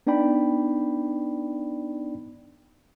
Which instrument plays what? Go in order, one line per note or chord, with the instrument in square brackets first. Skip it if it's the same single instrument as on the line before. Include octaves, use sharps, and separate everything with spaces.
[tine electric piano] B3 D4 D#4 D5 G5 B5